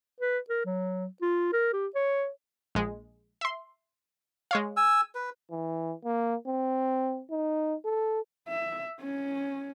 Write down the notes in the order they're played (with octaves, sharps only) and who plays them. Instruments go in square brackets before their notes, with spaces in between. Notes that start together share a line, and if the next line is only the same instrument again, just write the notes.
[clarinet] B4
A#4
F#3
F4
A#4
G4
C#5
[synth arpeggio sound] A#1 G#3
E5 C6
G#3 C#5 F5
[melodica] G#5 E6
B4
[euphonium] E3
A#3
C4
D#4
A4
[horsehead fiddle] E5
C#4